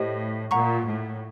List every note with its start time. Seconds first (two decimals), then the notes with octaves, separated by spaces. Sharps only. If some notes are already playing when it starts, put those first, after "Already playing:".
Already playing: A2 G4 C5 D#5
0.51 A#2 F#5 A#5 C#6
0.86 A2